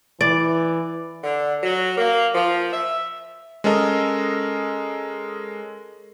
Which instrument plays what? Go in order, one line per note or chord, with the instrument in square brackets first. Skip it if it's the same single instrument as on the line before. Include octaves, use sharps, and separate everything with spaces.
[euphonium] E3 [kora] D5
[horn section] D3
F#3
A#3
F3
E5
[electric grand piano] G#3 C#4 A4 A#4 D#5